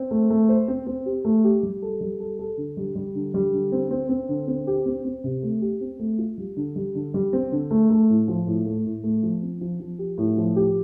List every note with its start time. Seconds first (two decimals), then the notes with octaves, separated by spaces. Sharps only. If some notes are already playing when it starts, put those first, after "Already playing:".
Already playing: C4
0.11 A3
0.30 A3
0.49 C5
0.68 C4
0.87 C4
1.06 G4
1.25 A3
1.44 G4
1.63 G3
1.82 A4
2.01 G3
2.20 A4
2.39 A4
2.57 D3
2.77 G3
2.96 G3
3.15 D3
3.34 G3
3.53 D3
3.72 C4
3.91 C4
4.09 C4
4.29 D3
4.48 C4
4.67 G4
4.86 C4
5.05 C4
5.24 C3
5.43 A3
5.62 G4
5.81 C4
5.99 A3
6.18 F4
6.38 G3
6.57 D3
6.76 G3
6.95 D3
7.14 G3
7.33 C4
7.52 D3
7.71 A3
7.90 A3
8.09 A2
8.28 F3
8.47 A2
8.66 A3
8.85 A2
9.04 A3
9.23 F3
9.42 C4
9.61 F3
9.80 F3
9.99 G4
10.18 A2
10.37 F3
10.56 G4